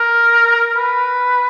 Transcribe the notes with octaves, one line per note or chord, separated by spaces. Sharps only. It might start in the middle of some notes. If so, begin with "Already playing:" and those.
Already playing: A#4
B4